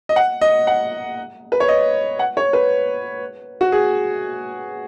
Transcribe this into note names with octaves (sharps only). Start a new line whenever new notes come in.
D#5
F#5
D#5
F#5
B4
C#5
D#5
F#5
C#5
B4
F#4
G#4